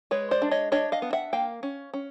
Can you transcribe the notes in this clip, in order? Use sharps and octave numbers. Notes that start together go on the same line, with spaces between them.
G#3 B4 C#5
C5 D5
D4
C#5 D#5
D4 C#5 D#5
D#5 F5
B3
E5 F#5
A#3 F5 G5
C#4
C#4